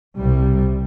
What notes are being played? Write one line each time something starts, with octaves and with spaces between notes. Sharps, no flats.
C2 C3 G3